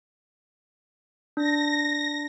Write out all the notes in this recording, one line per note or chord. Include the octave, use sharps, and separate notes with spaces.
D4 A#6